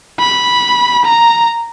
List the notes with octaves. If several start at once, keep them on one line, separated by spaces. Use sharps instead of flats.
B5
A#5